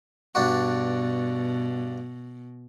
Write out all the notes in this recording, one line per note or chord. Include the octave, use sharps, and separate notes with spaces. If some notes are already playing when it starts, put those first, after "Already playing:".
G2 B2 D4 F#4